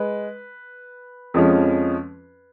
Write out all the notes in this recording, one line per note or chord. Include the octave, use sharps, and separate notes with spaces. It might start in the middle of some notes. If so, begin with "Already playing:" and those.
Already playing: G#3 B4
F2 F3 G#3 C#4